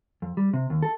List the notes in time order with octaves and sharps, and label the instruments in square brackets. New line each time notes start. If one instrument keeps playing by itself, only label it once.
[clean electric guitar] F2
G3
C3
D#2
A4